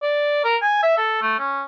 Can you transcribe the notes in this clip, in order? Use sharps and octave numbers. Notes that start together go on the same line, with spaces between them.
D5
A#4
G#5
E5
A4
A3
C#4